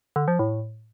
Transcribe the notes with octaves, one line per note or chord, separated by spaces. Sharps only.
D3
F3
A2